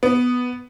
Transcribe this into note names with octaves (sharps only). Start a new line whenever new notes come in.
B3